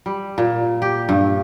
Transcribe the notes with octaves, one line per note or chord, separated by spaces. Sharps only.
G3
A#2
G4
G2